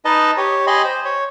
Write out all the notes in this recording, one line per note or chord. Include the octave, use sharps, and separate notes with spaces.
D#4 B4 D#5 A5
G4 C#5
G4 D#5 G#5 B5 C6
C5
C#5